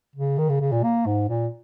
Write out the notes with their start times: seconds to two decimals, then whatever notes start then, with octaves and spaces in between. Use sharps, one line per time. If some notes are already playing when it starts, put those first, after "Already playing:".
0.16 C#3
0.39 D#3
0.49 C#3
0.61 C#3
0.72 A#2
0.84 A#3
1.06 G#2
1.29 A#2